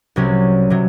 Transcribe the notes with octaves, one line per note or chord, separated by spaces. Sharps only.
C2 C3 F#3 C#4
C3 F#3